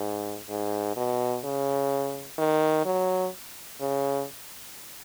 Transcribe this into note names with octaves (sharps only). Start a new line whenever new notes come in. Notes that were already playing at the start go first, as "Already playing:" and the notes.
Already playing: G#2
G#2
B2
C#3
D#3
F#3
C#3